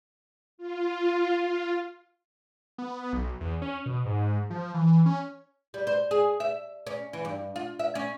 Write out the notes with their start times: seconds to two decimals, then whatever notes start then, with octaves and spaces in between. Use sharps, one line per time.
0.58 F4
1.40 F4
2.78 B3
3.13 B1
3.41 E2
3.62 C#4
3.86 B2
4.06 G#2
4.50 F3
4.74 E3
5.06 C#4
5.74 G3
5.87 C5
6.11 G#4
6.40 E5
6.87 C#4
7.13 E3
7.25 G2
7.56 F4
7.79 E5
7.95 C#4